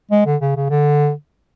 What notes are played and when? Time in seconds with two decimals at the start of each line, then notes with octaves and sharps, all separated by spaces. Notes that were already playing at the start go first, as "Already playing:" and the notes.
0.11 G#3
0.26 D3
0.41 C#3
0.56 C#3
0.70 D3